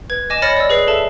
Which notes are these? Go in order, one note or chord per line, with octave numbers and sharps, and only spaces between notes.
B4 G#6
D#5 G#5 D6 A#6 E7
C#5 B5 F6 A6 A#6 C#7
D5 E6
G#4 B4 C7
A4 E5 A5